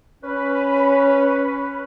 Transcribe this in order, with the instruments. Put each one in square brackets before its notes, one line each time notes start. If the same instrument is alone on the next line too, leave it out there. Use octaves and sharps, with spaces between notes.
[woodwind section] C#4 B4